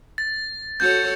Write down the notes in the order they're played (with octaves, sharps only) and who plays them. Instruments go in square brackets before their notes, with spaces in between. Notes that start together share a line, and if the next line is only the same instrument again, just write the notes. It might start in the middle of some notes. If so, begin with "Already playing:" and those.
[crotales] A6
[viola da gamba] F#4 A4 C#5 [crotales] G6